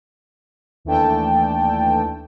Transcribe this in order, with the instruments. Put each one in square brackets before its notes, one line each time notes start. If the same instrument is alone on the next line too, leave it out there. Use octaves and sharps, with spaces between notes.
[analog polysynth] D#2 E3 A3 D4 G5 A5